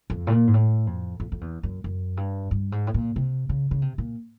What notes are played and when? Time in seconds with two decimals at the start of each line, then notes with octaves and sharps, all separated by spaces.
0.10 F2
0.27 A2
0.32 A#2
0.47 G#2
0.54 A2
0.87 F2
1.20 F2
1.32 F2
1.41 E2
1.63 F#2
1.84 F#2
2.17 G2
2.51 G2
2.72 G#2
2.87 A2
2.94 A#2
3.16 C3
3.49 C#3
3.71 C#3
3.82 C3
3.98 A#2